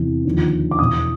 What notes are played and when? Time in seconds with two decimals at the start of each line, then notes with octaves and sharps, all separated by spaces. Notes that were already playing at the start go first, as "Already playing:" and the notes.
Already playing: E2 C3 E3
0.25 D#2 D3 F3
0.71 D6
0.79 E2 B2 D#6